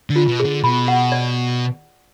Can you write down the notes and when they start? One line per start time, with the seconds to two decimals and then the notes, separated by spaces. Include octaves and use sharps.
0.10 D3
0.16 F4
0.28 B2
0.40 G#4
0.45 D3
0.63 B2 B5
0.88 F#5
1.12 D5